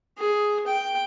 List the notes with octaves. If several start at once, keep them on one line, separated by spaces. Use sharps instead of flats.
G#4
G5